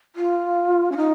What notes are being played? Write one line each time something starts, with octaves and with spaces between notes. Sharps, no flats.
F4
C#4
D#4